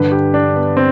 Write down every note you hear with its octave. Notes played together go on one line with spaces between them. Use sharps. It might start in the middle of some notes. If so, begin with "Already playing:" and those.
Already playing: G2 D3 B4
G4
D4
B3
C4